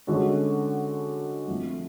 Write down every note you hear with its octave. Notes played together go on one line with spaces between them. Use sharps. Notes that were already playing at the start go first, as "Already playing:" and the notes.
D3 G#3 C#4 F#4 A4
F2 F3 A3